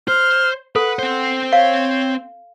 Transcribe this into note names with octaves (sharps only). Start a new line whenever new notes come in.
C5 F6
A4 B4 F#5
C4 C5
C#5 F5